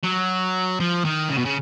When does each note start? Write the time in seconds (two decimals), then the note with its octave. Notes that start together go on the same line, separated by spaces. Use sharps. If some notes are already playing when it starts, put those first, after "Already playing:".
0.04 F#3
0.80 F3
1.05 D#3
1.30 C#3
1.37 B2
1.45 C#3